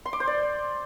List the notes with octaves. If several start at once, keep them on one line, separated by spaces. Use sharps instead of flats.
C6
D6
C5
D5